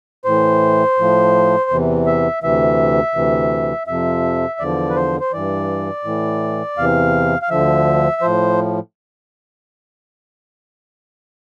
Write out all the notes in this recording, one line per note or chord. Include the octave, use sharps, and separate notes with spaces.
A2 E3 C5
A2 F3
E2 C3 E3
E5
D2 C3 E3 E5
D2 C3 E3
F2 C3 F3 E5
E2 D3 F3 D5
B4
C5
C5
G2 E3 D5
A2 E3
E2 C3 E3 F5
F5
D2 D3 F3 E5
A2 F3 C5